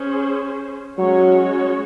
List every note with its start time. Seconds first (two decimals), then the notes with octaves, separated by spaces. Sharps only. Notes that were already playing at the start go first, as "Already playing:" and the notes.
Already playing: C#4 G#4 C5
0.98 F#3 G#3 C#4 F#4 C#5